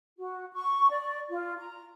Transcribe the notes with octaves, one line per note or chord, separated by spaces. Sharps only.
F#4
C#6
D5
F4
A#5